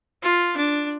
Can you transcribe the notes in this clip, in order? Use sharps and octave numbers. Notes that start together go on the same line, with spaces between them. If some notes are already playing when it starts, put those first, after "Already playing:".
F4
D4